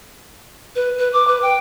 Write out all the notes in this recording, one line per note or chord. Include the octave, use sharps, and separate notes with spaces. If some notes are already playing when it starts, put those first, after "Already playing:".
B4
B4
D6
B4
G5